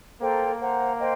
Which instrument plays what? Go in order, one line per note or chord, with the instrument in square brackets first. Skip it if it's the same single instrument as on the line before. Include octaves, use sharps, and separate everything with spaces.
[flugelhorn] A#3 [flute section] A4 C5 G5 A#5
[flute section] C5 F#5 A#5
C5 D#5 G5